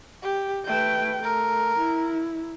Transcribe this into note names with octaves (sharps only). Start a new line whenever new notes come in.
G4
A3 B4 G5
A3 A#4
E4